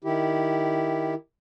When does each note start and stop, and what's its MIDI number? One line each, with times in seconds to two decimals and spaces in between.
0.04 1.14 51
0.04 1.14 64
0.04 1.14 67